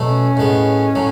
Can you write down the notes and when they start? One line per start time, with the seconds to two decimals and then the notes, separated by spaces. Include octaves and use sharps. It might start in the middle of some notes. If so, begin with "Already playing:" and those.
Already playing: B2 F#3 A3
0.09 C#4
0.37 A2 G#3 B3
0.95 A2 F#3